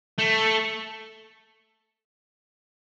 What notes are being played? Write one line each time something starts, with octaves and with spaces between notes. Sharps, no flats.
A3